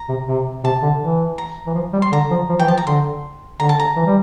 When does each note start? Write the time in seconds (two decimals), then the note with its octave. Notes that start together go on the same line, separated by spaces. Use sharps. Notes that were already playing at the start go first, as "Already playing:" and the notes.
Already playing: A#5
0.09 C3
0.28 C3
0.64 C3 A5
0.82 D3
1.01 E3
1.38 A#5
1.67 E3
1.75 F3
1.93 G3
2.02 C6
2.12 D3 A#5
2.31 F3
2.49 F3
2.59 E3 G5
2.67 F3 A5
2.78 A#5
2.87 D3 C6
3.60 D3 A#5
3.69 A5
3.80 A#5
3.96 E3
4.07 G3